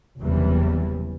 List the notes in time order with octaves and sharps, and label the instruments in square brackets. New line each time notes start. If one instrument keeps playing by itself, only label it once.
[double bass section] F#1 E2 C3 E3 G3